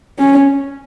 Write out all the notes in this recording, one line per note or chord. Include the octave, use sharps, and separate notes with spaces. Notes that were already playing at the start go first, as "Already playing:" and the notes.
C#4